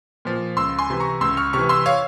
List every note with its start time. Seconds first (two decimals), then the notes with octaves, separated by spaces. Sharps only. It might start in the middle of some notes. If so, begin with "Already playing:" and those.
0.25 A#2 F3
0.57 C#2 C6 E6
0.78 G#5 C6
0.90 C3 E3
1.00 A#5 C#6
1.21 C#2 C6 E6
1.37 C#6 F6
1.53 C3 E3 C#6 F6
1.69 C6 E6
1.86 C#5 F5